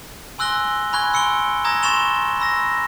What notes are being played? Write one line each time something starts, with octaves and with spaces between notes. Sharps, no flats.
G#5 C6 E6 F#6 A#6 G7
G#5 B5 C#6 F#6 G#6 G7
C6 E6 C#7 D7 G7
A#5 D#6 E6 G#6 A#6
C6 C#6 A6 E7 F7 G7
B5 E6 A#6